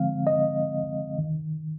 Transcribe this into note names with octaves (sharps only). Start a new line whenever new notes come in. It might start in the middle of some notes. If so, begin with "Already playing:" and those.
Already playing: D3 F3 G#3 C4 F5
D#5
D#3